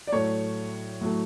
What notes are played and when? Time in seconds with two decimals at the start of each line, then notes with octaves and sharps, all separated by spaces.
0.07 D5
0.12 A2 F#3 A3 C#5
1.01 A2 F#3 A3